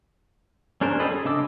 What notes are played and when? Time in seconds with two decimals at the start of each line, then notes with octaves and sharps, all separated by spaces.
0.81 C#4 D4 G#4 A#4 C5
1.00 G4 A4 C5 D#5 B5
1.12 G#4
1.25 C#3 D4 D#5 D6 E6